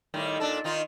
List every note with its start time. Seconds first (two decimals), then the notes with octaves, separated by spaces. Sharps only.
0.14 A2 D#3 G3
0.40 A#2 D4 A4
0.64 D#3 D#4 F4